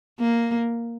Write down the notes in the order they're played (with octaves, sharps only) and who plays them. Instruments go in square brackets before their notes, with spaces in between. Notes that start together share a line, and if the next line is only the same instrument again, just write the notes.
[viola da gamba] A#3